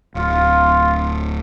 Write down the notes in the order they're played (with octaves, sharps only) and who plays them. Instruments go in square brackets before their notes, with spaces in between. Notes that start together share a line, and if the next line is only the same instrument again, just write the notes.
[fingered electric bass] D1 [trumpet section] F4